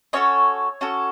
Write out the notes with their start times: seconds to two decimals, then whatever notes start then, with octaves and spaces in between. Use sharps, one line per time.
0.13 C#4 F#4 A4 C#5 D#5
0.81 C#4 F#4 A4